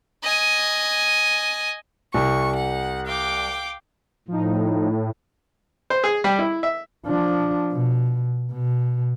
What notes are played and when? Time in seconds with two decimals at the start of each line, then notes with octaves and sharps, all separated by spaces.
0.24 D#5 G#5
2.14 C2 C#6
2.55 F#5
3.06 F5 G5 D6
4.28 A2 F3 D#4
5.90 C5
6.04 G#4
6.24 G3
6.39 E4
6.63 E5
7.06 F3 D4
7.72 B2
8.52 B2